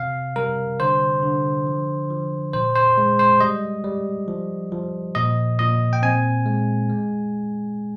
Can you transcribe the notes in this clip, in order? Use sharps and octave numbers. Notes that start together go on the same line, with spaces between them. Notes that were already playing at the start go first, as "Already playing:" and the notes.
Already playing: C3 F5
G3 A#4
D3 C5
D3
F3
F3
A#2 C5
C5
G#3
C5
G3 D#5
G3
F3
F3
A#2 D#5
A#2 D#5
G5
C4 G#5
G#3
G#3